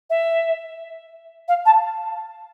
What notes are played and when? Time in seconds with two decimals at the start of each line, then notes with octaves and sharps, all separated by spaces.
0.10 E5
1.48 F5
1.66 A5